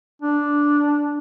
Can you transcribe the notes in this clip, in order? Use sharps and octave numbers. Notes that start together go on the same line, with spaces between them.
D4